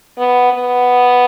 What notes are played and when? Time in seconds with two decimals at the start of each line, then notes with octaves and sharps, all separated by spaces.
0.18 B3
0.53 B3